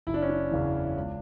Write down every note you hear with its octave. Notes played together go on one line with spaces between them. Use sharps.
F#1 E4
D4
C#4
D4
E2 C#3 E3
C#2